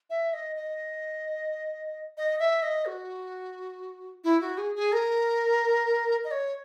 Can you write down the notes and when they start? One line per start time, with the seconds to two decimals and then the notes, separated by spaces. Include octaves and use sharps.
0.10 E5
0.33 D#5
0.56 D#5
2.17 D#5
2.39 E5
2.62 D#5
2.86 F#4
4.24 E4
4.41 F#4
4.58 G#4
4.75 G#4
4.92 A#4
6.24 D#5
6.31 C#5